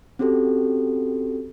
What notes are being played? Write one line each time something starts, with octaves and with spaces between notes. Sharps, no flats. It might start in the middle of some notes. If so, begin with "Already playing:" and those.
C4 C#4 F#4 G4 A4